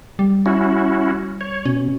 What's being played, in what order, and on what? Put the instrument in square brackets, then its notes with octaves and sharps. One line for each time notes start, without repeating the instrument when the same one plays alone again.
[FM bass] G3
[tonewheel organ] C#4 E4 F#4
C#5
[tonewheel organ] B2 [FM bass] C#4